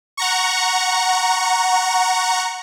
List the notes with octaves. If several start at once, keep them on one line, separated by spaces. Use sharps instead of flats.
F#5 A#5 C#6